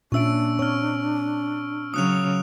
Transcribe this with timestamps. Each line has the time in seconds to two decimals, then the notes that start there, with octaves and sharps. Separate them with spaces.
0.12 A#2 C#4 D4 E5 C#6 E6 D7
0.59 C4 C#5 C#6 F6
1.94 C#3 F#3 D#6 F#6 F7